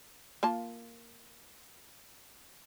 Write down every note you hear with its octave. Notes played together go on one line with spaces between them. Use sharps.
A#3 F4 A5